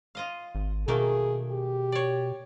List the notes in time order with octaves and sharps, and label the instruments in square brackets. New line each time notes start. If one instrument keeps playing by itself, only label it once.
[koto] F4 D#5 F5
[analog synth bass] G#1
[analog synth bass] B2 [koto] D#3 A3 A#3 [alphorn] G#4
[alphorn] G4
[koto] C#5 D5